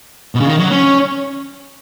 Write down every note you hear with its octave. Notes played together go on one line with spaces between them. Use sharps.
B2
C#3
D#3
F#3
C#4